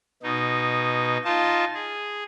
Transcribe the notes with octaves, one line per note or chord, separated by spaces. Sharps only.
B2 D#4
D#4 F4 A5
G#4